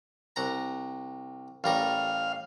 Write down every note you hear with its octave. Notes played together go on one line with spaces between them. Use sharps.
C2 F#5 A#5
A1 G3 A#4 F5